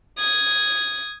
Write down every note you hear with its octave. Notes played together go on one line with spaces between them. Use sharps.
D#6 G#6